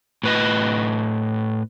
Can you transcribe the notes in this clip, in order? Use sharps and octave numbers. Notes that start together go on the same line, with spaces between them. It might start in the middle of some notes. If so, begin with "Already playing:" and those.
A2 B4 D#5